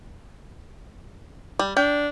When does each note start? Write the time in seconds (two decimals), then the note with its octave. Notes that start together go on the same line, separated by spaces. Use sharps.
1.59 G3
1.77 D4 G5